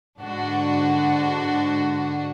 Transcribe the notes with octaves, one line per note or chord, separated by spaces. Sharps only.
G#2 D3 D4 F#4